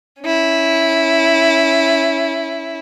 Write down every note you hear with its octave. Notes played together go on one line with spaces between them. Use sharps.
C#4 E4